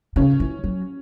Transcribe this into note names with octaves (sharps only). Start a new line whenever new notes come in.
C#3 C#4
E3
F#3